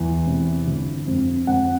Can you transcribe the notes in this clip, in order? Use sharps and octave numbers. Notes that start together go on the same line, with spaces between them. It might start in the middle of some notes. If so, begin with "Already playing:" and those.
Already playing: E2
C3
G1
F2
F2 F#5